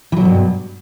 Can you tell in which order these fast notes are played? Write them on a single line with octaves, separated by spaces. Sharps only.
E3 F#3 B2 G2